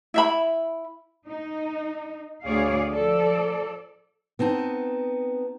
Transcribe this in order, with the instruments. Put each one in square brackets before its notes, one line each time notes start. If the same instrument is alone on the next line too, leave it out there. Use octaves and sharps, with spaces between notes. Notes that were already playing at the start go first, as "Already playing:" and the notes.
[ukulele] E4 E5 B5
[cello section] D#4
D2 G#4 C#5 D5 F5
F3 A4 D5
[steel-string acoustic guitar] B3 C4 D#4 A5